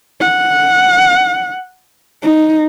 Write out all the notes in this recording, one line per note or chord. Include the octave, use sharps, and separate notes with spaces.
F#5
D#4